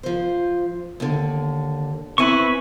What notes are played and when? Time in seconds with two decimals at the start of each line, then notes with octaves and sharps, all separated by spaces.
0.03 F3 C5
1.00 D#2 D3
2.18 C4 C#4 E4 B4 G#5 C#6